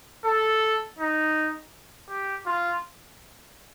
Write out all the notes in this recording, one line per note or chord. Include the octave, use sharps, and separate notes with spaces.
A4
D#4
G4
F4